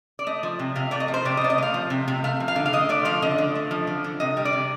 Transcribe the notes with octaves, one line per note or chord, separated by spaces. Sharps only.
D5
A3 D#5
F3
C3
C3 F5
A3 D5
D#5
F3
C5
C3 D5
D#5
C3 D5
D#5
A3 F5
F3
C3
C3
A3 F5
F3
F5
D3
F5
D3 D#5
A3 D5
F3 F5
D3 D#5
D3
A3
F3
D3
D3
C3 D#5
G3
D5
C3